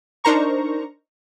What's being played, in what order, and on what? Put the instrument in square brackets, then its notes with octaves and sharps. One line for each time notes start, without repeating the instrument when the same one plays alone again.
[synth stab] D4 D#4 A#4 C5 A#5 C#6